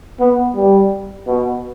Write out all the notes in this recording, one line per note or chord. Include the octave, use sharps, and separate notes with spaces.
B3
G3
B2